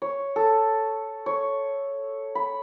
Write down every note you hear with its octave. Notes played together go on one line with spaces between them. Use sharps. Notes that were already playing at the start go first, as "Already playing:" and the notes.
C#5
A4
C#5
B5